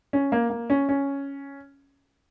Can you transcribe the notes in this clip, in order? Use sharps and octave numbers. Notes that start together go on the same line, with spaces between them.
C#4
A#3
A#3
C#4
C#4